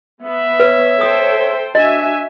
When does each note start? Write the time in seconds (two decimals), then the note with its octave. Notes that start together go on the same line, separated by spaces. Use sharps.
0.22 B3 E5
0.60 B4 C#5
1.01 A4 C5 G5 D#6
1.75 D4 F#4 D#5 E5 G#5